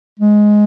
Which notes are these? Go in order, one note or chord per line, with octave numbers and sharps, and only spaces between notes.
G#3